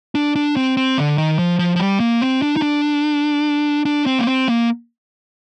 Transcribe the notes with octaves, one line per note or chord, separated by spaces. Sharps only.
D4
D4
C4
C4
D3
D#3
F3
F3
F3
G3
A#3
C4
D4
D#4
D4
D4
C4
A#3
C4
A#3